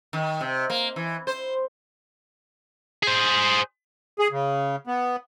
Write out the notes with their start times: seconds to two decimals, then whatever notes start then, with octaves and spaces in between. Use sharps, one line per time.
0.13 D#3
0.41 C3
0.70 A#3
0.96 E3
1.27 C5
3.03 G#4 C5
4.19 G#4
4.32 C#3
4.87 B3